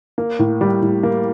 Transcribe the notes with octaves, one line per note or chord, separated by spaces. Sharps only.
A#3
A2
G3
A2
A#3